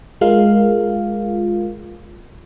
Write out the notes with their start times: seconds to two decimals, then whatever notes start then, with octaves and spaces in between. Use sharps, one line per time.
0.21 G#3 F4 A#4 F5